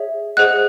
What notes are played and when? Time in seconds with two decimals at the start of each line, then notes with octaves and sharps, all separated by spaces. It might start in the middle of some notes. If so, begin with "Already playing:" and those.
Already playing: G#4 C#5 E5
0.37 G#4 C5 D#5 F#5 F#6